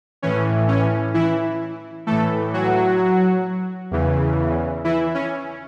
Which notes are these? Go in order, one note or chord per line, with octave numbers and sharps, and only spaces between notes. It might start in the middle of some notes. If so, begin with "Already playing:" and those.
A2 E3 C#4
C#4
E3 E4
A2 E3 A3 A4
F#3 F#4
E2 C#3 E3
E3 E4
C#4